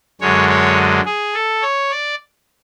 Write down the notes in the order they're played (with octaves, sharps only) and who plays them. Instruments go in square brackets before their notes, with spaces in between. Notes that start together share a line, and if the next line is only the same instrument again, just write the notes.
[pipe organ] F#2 D3 G#3 C#5
C#5
G#4
A4
C#5
D5